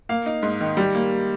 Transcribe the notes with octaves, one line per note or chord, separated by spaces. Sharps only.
A#3 F5
D#4
G#2
D#3
G3
A#3